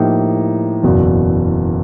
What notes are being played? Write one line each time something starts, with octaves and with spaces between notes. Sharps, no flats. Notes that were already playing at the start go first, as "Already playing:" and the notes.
Already playing: A2 F3 A#3 D#4 G4
F#1 E2 B2